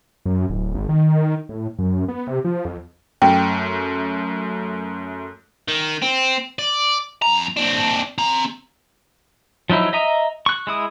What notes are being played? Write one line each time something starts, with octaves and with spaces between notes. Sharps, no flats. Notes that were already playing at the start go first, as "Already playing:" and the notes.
F#2
D1
G#1
D#3
A2
F#2
B3
C3
F3
F2
F#2 A3 G5
D#3
C4
D5
F2 A#5
C4 D4
C4 A#5
F3 F#3 D#4 E4
D#5 E5 A#5 D#6
C#6 F#6
G#3 E4 D#6